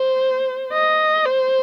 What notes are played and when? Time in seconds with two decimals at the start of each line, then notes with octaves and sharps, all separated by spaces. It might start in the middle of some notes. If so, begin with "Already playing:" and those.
Already playing: C5
0.73 D#5
1.26 C5